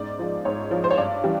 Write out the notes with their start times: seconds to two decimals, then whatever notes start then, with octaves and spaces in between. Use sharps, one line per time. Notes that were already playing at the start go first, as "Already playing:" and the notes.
Already playing: G#2 D5
0.19 F3 G#3
0.45 G#2 C#5
0.71 F3 G#3
0.84 C5
0.91 C#5
0.98 G2 D5
1.24 E3 G3